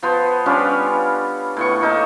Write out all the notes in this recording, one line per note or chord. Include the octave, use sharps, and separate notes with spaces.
F3 B3 C5
G3 C#4 D4 F4
A2 B3 C#6
A#3 D#4 A4